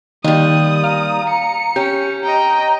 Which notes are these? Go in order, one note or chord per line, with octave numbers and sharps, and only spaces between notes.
D#2 D#3 G3 D#6
F5 A#5
C#7
C#4 G4
D#5 G5 A#5